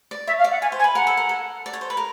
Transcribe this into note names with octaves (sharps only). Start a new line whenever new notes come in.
D5
C#5 E5
F5
D5
F#5
C#5 G#5
C5
G#5
B4
A#4 F#5
A4
A#4
A4
D5
C#5
C5
B4
A#4